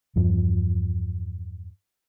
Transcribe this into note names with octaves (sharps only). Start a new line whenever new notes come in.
E2 G2 F3